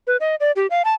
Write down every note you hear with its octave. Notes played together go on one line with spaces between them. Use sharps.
B4
D#5
D5
G4
F5
A5